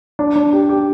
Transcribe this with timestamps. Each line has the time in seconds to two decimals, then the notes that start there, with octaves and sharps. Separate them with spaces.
0.19 D4
0.36 D4
0.53 G4
0.69 G4